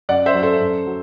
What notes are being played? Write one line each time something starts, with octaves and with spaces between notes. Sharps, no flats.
F#2 D5 F#5
C5 E5
F#3
A4 C5
F#2
F#3